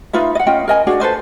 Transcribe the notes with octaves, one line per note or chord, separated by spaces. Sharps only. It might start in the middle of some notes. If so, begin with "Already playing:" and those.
D#4 F4 B4 E5
D#5 F#5
C#4 F4 D#5 G5
A#4 D#5 G#5
D4 F#4 G#4
A4 B4 C5 D#5